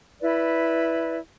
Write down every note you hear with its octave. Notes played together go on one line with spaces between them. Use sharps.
E4 B4 D5